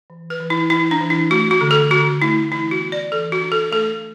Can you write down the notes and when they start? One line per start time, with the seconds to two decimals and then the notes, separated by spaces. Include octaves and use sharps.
0.10 E3
0.30 B4
0.40 E3
0.50 E4
0.70 E3 E4
0.91 D4
1.01 E3
1.10 E4
1.30 A3 F#4
1.51 F#4
1.61 D3
1.71 A4
1.91 D3 F#4
2.22 A3 E4
2.52 E3 E4
2.71 F#4
2.81 B3
2.92 D5
3.12 E3 A4
3.32 F#4
3.42 D4
3.52 A4
3.71 A3 A4